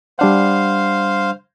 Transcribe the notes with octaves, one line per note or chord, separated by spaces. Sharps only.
G3 D4 C5 F5 F#5